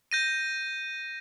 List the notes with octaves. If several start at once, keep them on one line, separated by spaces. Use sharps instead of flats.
G6 A#6 D#7